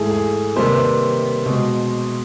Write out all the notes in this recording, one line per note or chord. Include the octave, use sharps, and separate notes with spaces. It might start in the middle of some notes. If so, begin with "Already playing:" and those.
Already playing: G#2 E3 A3 G#4
G#4
C3 D#3 G3 A#3 C5
B4
C5
B2 G#3